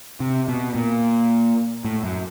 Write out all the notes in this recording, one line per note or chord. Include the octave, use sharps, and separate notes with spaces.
C3
B2
A#2
A2
F#2